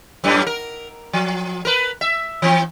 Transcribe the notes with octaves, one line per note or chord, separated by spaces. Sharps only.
F#2 A2 G3
A#4
F3
A#4 B4
E5
E3 C4